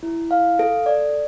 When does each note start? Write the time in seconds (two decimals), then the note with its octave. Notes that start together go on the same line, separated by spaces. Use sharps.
0.03 E4
0.31 F5
0.59 A4
0.86 D5